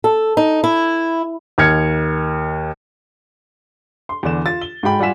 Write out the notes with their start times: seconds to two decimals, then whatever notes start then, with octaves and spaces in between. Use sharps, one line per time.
0.04 A4
0.37 D#4
0.64 E4
1.58 D#2 F6 G#6 C#7
4.09 C6
4.23 E2 D3 D4 E7
4.45 F4 A6
4.62 G7
4.83 G#2 F#4 G#4 G5 B5
5.00 G3 F4 F#5 G#5 B6 E7